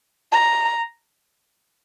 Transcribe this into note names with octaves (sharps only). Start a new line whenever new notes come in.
A#5